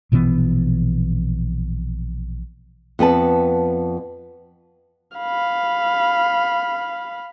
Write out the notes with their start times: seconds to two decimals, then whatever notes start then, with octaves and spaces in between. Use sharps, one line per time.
0.12 A#1 B2 E3 B3
2.99 F2 B3 B4 A5
5.17 F5 B5